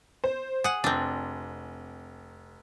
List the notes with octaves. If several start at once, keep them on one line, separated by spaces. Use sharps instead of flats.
C5
G#4 F#5
F1 C4 D4